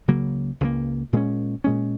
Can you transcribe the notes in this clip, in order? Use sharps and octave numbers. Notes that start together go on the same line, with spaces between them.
C#2 C#3 F#3 A#3
C#2 C#3 F#3 A#3
A#2 G#3 C#4
A#2 G#3 C#4